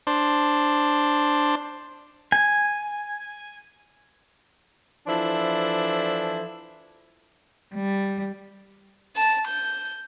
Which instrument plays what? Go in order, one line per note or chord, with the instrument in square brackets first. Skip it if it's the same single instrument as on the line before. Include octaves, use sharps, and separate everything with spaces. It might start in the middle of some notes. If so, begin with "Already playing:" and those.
[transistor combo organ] D4 C5
[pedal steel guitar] G#5
[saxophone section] E3 F3 D4 E4 A4 C5
[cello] G3
[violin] A5
G6